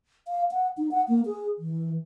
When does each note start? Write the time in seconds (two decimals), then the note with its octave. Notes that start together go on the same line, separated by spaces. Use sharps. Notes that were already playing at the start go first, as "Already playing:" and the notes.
0.28 F5
0.52 F#5
0.77 D#4
0.91 F#5
1.08 A#3
1.26 G#4
1.58 E3